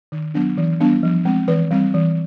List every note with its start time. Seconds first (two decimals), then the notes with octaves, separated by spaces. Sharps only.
0.12 D#3
0.34 F#3 B3 D4
0.57 E3
0.80 G3 B3 D4
1.03 F3
1.25 G#3 C4
1.48 E3 B4
1.71 G3 C4
1.94 E3